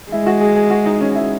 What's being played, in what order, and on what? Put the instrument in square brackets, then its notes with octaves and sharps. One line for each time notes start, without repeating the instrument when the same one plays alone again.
[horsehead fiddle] G#3 [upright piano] E4
[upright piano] F#4
G#4
G#4
F#4
D#4
C#4
E4